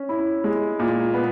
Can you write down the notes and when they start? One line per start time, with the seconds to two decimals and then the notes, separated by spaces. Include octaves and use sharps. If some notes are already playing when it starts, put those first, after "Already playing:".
Already playing: C#4
0.09 E4
0.44 G#3
0.79 A#2
1.14 B3